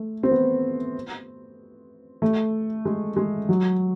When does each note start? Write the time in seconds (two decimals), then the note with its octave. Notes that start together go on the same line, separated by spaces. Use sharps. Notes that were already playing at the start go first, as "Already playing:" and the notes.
Already playing: A3
0.23 C4
0.31 B3
2.22 A3
2.85 G#3
3.16 G#3
3.49 F#3